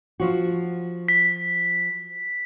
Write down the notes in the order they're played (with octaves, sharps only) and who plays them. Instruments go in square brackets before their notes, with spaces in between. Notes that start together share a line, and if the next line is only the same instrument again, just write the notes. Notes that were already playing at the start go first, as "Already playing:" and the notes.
[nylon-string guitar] F3 F#4
[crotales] B6